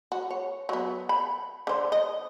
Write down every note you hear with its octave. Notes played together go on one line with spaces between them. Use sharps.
F#4
C#5
F#3 B3
B5
D3 C5
D#5